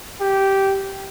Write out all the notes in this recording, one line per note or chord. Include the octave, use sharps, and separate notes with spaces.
G4